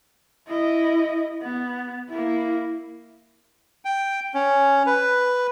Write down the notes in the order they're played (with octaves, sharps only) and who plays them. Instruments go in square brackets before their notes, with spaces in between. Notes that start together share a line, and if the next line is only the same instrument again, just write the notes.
[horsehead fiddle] E4 D#5
B3
A#3 E4
[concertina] G5
C#4
B4